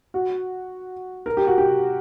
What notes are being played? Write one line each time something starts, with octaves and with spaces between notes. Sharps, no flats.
F#4
A#4
G4
F#4
G4